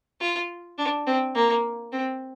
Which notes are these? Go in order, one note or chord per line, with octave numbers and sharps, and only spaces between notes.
F4
D4
C4
A#3
C4